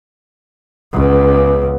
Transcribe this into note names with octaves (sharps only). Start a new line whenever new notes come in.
C#2 C#3 B3